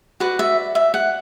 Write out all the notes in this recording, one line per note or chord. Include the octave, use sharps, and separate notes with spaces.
F#4 B4 D5 F#5
E5
E5
F#5